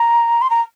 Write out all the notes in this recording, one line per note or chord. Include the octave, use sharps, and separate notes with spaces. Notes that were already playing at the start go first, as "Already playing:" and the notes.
Already playing: A#5
C6
A#5